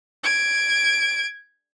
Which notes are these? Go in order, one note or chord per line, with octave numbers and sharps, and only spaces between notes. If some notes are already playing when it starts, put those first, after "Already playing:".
G#6 D7